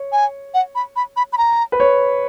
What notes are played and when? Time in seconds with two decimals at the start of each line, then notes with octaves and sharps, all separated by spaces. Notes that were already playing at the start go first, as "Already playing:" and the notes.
Already playing: C#5
0.12 G#5
0.54 F#5
0.75 B5
0.96 B5
1.16 B5
1.33 B5
1.38 A#5
1.72 B4
1.80 C#5